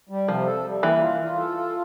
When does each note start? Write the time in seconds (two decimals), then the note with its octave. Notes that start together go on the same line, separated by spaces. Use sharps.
0.09 G3
0.28 C3 F3
0.46 A4
0.65 G3
0.83 E3 A#3
1.01 F4
1.20 F4
1.37 A4
1.57 F4